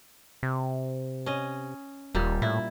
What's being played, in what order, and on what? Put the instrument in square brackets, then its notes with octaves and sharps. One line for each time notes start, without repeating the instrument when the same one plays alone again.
[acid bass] C3
[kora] C#4 D#5
[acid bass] D#1 [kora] A#2 G3
[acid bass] A2 [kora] E4